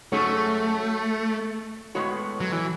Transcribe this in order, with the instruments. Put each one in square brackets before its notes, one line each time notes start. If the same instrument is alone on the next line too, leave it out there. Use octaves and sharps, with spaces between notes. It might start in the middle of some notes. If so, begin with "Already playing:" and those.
[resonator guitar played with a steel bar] G#2 F#3 C#4 G#4 C#5 [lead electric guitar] A3
[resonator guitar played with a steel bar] A2 G#3 B3 F#4 C#5
[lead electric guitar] F#3
E3